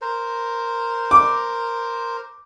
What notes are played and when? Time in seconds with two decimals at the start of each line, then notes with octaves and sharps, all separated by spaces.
0.02 A#4 C5
1.11 D6